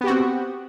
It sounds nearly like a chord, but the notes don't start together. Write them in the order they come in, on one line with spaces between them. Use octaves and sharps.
B3 G4 F#4 C4